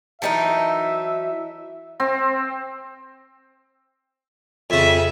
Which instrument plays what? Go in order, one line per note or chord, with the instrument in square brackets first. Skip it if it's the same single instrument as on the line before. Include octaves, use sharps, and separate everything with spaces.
[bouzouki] E3 F#3 D#4 [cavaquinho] A#4 G5 A5 [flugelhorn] E5
[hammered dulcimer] C4
[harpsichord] F2 C#3 [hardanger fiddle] E5